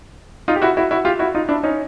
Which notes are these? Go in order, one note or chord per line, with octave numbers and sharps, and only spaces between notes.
D#4 F4
G4
E4 F#4
E4 F#4
E4 F#4
F4 G4
E4 F#4
D#4 F4
D4 E4
C#4 D#4